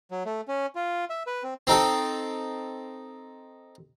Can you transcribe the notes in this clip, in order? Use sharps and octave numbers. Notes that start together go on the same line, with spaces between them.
F#3
A3
C#4
F4
E5
B4
C4
C4 D#4 A4